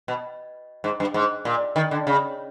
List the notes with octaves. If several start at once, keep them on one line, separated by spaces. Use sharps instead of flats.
B2
G#2
G2
G#2
A#2
D#3
D3
C#3